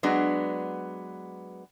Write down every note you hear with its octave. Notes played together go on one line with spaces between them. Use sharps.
F#3 G#3 B3 D4